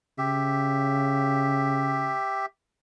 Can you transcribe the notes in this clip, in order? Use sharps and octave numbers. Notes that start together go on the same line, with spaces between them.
C#3 G4 E5